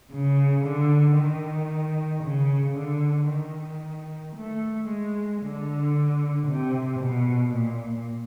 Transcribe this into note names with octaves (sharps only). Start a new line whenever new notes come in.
C#3
D3
D#3
C#3
D3
D#3
A3
G#3
D3
C3
B2
A#2